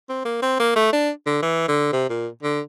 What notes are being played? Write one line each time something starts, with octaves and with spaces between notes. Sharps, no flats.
C4
A#3
C4
A#3
A3
D4
D3
E3
D3
C3
A#2
D3